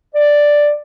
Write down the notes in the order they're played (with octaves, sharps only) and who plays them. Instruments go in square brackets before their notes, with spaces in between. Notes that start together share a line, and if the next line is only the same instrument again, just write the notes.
[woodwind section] D5